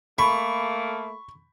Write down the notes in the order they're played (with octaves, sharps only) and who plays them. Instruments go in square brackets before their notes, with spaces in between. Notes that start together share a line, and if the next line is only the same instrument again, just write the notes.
[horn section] A3 A#3 [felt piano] B5 [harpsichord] C#6